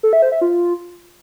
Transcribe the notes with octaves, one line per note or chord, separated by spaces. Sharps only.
A4
E5
C5
E5
F4